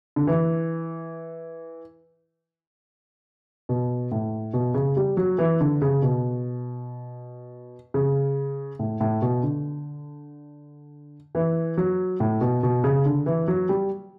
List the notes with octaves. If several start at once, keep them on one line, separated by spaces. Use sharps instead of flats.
D3
E3
B2
A2
B2
C#3
G3
F#3
E3
D3
C#3
B2
C#3
A2
A2
B2
D3
E3
F#3
A2
B2
B2
C#3
D3
E3
F#3
G3